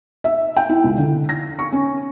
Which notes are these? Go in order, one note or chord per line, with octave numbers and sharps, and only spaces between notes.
E5
G5
E4
C#2
D3
A#6
C#6
C#4